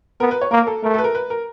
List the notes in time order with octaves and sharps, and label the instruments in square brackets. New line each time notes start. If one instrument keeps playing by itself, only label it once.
[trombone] B3 [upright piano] A#4
[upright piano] B4
C#5
[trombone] A#3 [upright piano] A#4
[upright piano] A4
[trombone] A3 [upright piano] A#4
[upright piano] A4
B4
A#4
B4
A#4